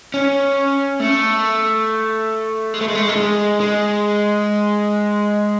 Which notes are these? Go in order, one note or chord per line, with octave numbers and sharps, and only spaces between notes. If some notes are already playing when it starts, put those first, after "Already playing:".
C#4
A3
G#3
A3
G#3
A3
G#3
A3
G#3
G#3